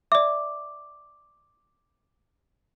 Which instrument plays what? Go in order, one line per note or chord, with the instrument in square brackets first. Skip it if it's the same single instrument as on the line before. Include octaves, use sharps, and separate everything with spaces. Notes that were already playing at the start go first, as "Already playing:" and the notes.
[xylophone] D5 E5 [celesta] D6